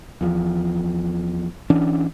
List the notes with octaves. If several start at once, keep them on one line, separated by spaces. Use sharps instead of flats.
E2 F3
E3 C#4 D4